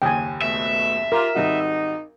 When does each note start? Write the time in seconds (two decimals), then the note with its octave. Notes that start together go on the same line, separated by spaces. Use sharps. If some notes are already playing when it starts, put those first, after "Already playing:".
0.02 F#1 D#2 G5 G#5 D#6
0.42 B2 A3 E5
1.12 F4 G4 A#4
1.35 G#1 G3 D#4 F#4